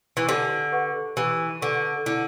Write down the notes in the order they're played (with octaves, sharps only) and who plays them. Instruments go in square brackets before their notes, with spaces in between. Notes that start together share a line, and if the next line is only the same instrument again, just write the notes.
[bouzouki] E3
[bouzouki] D3 [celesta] G4
[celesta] B4 F#5 C#6
[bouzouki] E3 [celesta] G4
[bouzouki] D3 [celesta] B4 F#5 C#6
[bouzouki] D3 [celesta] E4